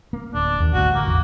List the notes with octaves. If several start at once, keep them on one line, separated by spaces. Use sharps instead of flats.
A#3
D1 D4
D#2
A1 D2 G2 F#4
A#3
A1 E2